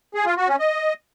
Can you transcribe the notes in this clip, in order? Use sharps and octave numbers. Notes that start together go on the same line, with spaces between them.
G#4
F4
F#4
C#4
D#5